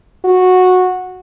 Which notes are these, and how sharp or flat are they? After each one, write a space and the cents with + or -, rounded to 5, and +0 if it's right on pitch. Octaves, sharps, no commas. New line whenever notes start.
F#4 -10